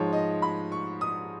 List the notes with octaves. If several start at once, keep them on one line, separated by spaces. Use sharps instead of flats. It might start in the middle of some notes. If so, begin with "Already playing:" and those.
Already playing: G#2 F3 G#3 C#5
D#5
B5
C#6
D#6